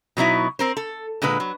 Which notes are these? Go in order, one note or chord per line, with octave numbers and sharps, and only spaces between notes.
B2 F#3 D#4 E4
C4 A#4 C5
A4
A#2 D3 G#3 B4
F#3